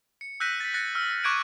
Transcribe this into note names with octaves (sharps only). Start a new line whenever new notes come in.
C#7
E6 F#6 G6 A#6 B6 D#7
A6 B6
F#6 A6 A#6 C#7
E6 F6
C#6 D6 F#6 G#6 D7 D#7